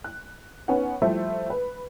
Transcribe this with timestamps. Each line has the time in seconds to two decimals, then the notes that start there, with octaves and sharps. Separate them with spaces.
0.04 F#6
0.68 B3 C#4 D#4 C#5 F#5
1.02 F3 G3 A3 E4 C5
1.50 B4